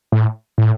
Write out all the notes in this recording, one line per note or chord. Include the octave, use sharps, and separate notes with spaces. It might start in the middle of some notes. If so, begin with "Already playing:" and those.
A2
A2